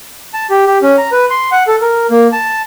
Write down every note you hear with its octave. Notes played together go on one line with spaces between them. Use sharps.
A5
G4
G4
C#4
A#5
B4
C6
F#5
A4
A#4
A#3
A5